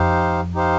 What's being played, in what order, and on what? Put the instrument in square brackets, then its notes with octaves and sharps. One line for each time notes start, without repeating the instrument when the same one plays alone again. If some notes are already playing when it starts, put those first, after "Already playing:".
Already playing: [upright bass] F2 [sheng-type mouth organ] D#4 G4 C5 F5
[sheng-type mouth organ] D#4 G4 C5 F5